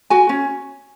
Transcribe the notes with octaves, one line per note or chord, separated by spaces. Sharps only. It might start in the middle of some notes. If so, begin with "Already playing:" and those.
F#4 G#5
C#4